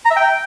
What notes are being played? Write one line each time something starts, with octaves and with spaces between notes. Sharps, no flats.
A#5
E5
G5